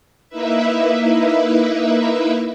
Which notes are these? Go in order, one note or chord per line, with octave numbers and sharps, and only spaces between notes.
A#3 D#4 E4 B4 E5